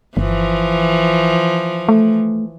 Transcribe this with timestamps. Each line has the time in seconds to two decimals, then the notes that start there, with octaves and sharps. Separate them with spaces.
0.17 G1 E3 F3
1.89 A3